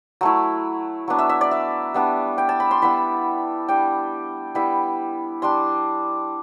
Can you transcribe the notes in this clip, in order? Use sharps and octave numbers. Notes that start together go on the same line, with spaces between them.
F#3 A3 E4
F#3 B3 D4
E5
E5
D5
E5
G3 B3 D4
G5
A5
B5
C6
G3 B3 E4 B5
G3 D4 G5
G3 B3 E4 B5
G3 D4 C6